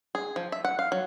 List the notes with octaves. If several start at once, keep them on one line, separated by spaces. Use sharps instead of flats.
G#4
F3
E5
F#5
F5
F#3